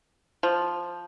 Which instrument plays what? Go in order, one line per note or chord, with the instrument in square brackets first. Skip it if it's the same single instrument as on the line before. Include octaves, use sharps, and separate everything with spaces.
[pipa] F3